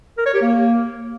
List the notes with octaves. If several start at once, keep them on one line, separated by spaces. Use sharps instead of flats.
A#4
C#5
G4
A#3